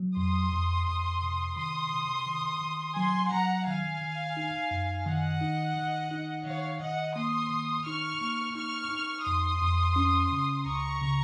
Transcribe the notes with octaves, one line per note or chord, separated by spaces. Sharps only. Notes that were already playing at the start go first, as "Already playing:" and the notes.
Already playing: F#3
F2 C6 D#6
F2
F2
C3
D#3 C6 D#6
C3
D#3
D#3
F#3 G#5 C6
F#3 F#5 A#5
D#3 F5 G#5
D#3
D#4
F#2
D#3 D#5 F#5
D#4
D#3
D#4
D#3 C#5 F5
D#3 D#5 F#5
A#3 C6 D#6
D#3
D#4 C#6 F6
A#3
D#4 C#6 F6
D#4
F2 C6 D#6
F2
C#4
C#3
C#2 A#5 C#6
C#3